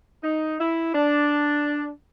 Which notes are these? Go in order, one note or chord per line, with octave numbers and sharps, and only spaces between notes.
D#4
E4
D4